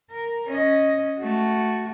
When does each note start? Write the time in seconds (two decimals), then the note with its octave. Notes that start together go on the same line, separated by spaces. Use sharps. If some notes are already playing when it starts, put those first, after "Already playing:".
0.11 A#4
0.48 C#4 D#5
1.20 A3 F#4